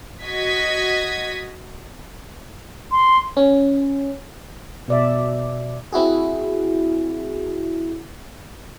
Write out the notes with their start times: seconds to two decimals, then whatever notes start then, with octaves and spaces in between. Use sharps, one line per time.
0.24 F#4 D#5 G#6 B6
2.92 C6
3.37 C#4
4.88 B2 D5 E5
5.92 C4 E4 F#4 G#4